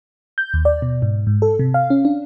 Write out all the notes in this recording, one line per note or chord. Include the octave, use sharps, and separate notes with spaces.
G6
D#2
D5
B2
G#2
G#2
A4
C3
F5
C#4
D4